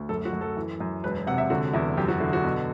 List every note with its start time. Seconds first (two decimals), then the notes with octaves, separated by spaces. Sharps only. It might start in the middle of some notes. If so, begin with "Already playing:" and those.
Already playing: D2
0.09 F#2 A4
0.25 F#4
0.33 F#2
0.41 A4
0.57 E3
0.80 F#2
1.04 E1 B4
1.27 C3 F#5
1.38 E5
1.50 D3 F#4
1.73 E2 E4
1.97 F#2 G4
2.08 F#4
2.20 D3 E4
2.33 F#4
2.44 B2